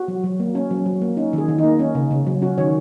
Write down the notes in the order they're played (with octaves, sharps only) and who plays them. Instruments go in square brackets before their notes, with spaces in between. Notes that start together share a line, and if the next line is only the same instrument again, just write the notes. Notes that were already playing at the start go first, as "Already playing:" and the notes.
Already playing: [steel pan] F#4
F#3
F#3
A#3
C#4
F#3
F#3
A#3
C#4 D#4
D#3 G#4
D#3
D#4
A#3
C#4
C#3
C#3
F#3
C#4 F#4
D#3 C#5